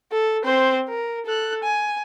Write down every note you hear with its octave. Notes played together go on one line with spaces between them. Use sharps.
A4
C4 C5
A#4
A4 F#6
G#5